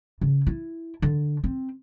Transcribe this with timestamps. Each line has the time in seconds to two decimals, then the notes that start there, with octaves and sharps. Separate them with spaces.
0.21 C#3
0.47 E4
1.02 D3
1.44 C4